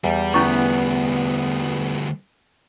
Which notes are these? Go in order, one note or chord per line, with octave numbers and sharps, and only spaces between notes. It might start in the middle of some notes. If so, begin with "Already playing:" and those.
E2 G3
D2 G3 B3 C#4 E4 C#6